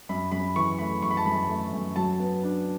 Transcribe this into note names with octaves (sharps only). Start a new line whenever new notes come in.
F#2 B5
F#2 B5
E3 C#6
A3 B5
F#2 C#6
B5
A5
F#2 B5
A3
F#2
F#3 A5
B3
D4